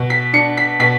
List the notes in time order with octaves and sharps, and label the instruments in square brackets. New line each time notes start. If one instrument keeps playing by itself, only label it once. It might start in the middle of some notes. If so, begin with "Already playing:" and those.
Already playing: [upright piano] B2
B6
D4 C#7
B6
B2 B6